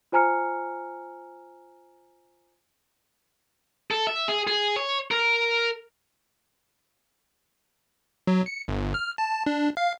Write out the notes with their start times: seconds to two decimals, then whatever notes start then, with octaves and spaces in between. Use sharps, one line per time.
0.12 F4 C5 G#5 A#5 F6 C#7
3.91 A4
4.07 E5
4.28 G#4
4.47 G#4
4.76 C#5
5.11 A#4
8.27 F#3
8.46 C#7
8.68 G1
8.94 F6
9.18 A5
9.46 D4
9.77 F5